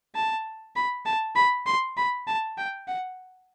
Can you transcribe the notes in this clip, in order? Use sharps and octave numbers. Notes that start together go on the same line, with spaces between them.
A5
B5
A5
B5
C6
B5
A5
G5
F#5